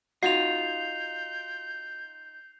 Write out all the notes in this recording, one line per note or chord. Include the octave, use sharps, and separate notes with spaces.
D#4 F4 F#4 G6 C7 F7